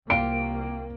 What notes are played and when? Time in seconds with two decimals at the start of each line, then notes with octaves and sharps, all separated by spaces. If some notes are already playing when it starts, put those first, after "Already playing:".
0.10 C2 A#3 F4 G4 D7